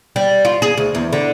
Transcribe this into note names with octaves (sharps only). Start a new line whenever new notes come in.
G3
F4
G#4
D2
E2
D3